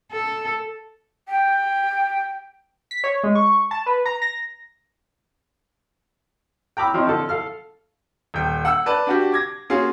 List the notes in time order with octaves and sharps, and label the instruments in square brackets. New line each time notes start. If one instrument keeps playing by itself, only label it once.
[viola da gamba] A4
[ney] G5
[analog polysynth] B6
C#5
G#3
C#6
A5
B4
A#5
A#6
[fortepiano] G5 A#5 B5 D6 E6
F3 C4 D#4 C#5
D3 F3 A4
A4 F5 F6
[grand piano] D#1 G5
F#5 E6
B4 D5 A5
D4 F#4 G4
D6 G#6 A#6
A#3 C#4 F4 F#4 G#4